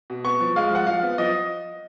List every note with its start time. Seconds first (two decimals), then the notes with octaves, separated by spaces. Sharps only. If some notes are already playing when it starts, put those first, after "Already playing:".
0.10 B2
0.24 B3 C#6
0.40 F3
0.56 G#3 F5
0.71 F3 F#5
0.87 F3 F5
1.03 B3
1.18 F3 D#5